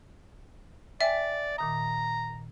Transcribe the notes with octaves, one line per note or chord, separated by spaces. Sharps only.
D5 E5 G5 G#5
A#2 D#3 A#5 D#6